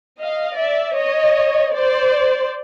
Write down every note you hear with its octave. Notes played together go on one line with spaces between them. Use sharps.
D#5 F5
D5 E5
C#5 D#5
C5 D5